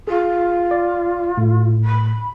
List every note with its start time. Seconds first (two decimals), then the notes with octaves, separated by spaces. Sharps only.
0.07 F4 G#4
0.71 D5
1.37 A2
1.84 B5